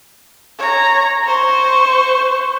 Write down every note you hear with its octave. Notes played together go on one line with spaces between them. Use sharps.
C#5 A#5
C5 C#6